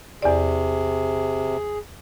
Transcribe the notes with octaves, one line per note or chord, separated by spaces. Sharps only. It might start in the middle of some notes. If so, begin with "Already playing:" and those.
E2 C3 G#4 D5